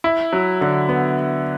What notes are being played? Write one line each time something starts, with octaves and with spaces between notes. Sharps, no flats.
E4
F#3
D3
B3